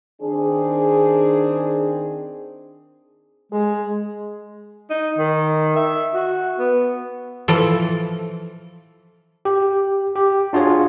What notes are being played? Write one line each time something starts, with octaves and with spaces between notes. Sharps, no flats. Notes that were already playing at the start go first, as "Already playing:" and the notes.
D#3 C4 D4 G#4
G#3 G#4
D#4
D#3
E5
F#4
B3
E3 F3 A4
G4
G4
D4 F4 F#4 G#4 C#5